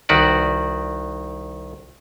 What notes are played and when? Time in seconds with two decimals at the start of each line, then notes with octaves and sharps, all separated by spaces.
0.09 C2 D#3 F#4 B4 D5